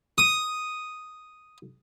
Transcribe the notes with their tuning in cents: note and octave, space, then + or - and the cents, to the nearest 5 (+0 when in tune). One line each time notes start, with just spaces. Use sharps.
D#6 +0